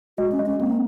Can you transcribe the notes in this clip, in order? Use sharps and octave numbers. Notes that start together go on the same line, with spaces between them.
G#3 F#4
C#4
G#3
C#4
A#3 C4